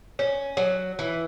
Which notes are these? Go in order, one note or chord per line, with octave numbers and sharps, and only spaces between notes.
C#4
F#3
E3